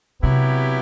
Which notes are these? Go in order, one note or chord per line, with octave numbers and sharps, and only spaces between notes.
C3 F#3 B3 E4 G4